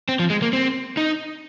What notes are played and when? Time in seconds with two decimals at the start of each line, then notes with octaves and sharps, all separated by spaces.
0.09 C4
0.19 F3
0.30 G#3
0.42 A#3
0.53 C4
0.97 D#4